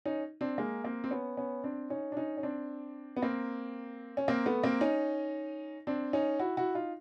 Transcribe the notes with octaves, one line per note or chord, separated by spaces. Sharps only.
C#4 D#4
C4 D4
G#3 A#3
A#3 C4
C4
B3 C#4
B3 C#4
C4 D4
C#4 D#4
D4
C#4 D#4
C#4
C4 D4
B3
A#3 C4
C#4
A#3 C4
A3 B3
A#3 C4
C#4 D#4
C4 D4
C#4 D#4
E4 F#4
E4 F#4
D#4 F4